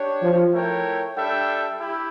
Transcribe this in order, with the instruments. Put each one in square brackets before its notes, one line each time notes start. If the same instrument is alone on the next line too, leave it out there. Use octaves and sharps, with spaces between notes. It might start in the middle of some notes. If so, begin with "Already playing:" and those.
Already playing: [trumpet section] D4 G4 C#5
[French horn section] F3
[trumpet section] A3 E4 A#4 C#5 G5
G3 D4 A4 E5 G5
E4 G4